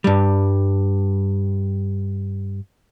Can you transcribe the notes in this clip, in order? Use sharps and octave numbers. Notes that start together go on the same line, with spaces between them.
G2 G3